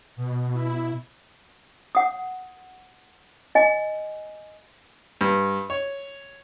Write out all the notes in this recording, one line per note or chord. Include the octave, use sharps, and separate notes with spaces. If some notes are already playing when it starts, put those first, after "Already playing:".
B2
E4
F#5 D#6
D#5 G#5
G2
C#5